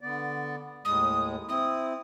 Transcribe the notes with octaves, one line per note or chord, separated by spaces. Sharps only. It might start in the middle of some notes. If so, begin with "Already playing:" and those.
D3 B3 D5
D#2 A2 G#3 D#6
C4 E4 D#6